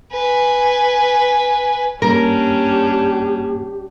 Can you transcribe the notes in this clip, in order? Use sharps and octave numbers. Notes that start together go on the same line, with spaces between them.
B4 G#5
G2 G3 A#3 C#4 D4 G4 A#4